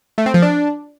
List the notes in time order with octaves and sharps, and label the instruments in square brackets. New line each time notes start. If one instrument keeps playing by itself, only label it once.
[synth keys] A3
C4
F3
D4